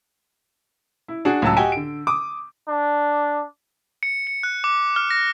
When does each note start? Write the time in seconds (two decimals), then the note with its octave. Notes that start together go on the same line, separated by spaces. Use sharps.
1.08 E4
1.25 D4 F#4 G#4
1.42 C#2 A2 F#3 A5 E6
1.57 F#4 G4 D#5 G5 G#5
1.72 D3 D7
2.07 D6 D#6
2.68 D4
4.03 C#7
4.27 C#7
4.43 F#6
4.64 D6
4.96 F6
5.10 A#6